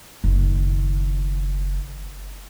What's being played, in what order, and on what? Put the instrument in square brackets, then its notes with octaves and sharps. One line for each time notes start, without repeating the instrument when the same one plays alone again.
[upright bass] F#1 D#3